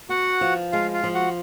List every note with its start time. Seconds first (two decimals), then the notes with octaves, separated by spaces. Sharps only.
0.09 B3 F#4 F#5
0.41 F3
0.72 G#3 F4 F5
0.93 F4 F5
1.04 F3
1.14 F#4 F#5